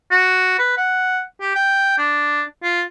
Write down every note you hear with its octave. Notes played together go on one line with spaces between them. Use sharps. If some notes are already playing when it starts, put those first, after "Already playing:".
F#4
B4
F#5
G4
G5
D4
F4